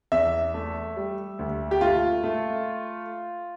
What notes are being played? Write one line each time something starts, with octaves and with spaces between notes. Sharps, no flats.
E2 E5
A3
G3
D2
G4
A3 F4
A3